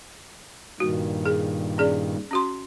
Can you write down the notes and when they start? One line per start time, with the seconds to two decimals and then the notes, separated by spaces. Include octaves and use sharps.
0.80 G2 A#2 D#3 F#4
1.26 G#4
1.78 C#4 G#4 D5
2.31 C#4 F#4 C6